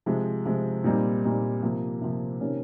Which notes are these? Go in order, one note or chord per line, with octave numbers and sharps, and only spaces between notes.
C3 F3 G#3
C3 F3 G#3
A#2 G3 C4 D#4
A#2 G3 C4 D#4
C3 F3 A#3
C3 F3 A#3
C3 D#3 A#3 C#4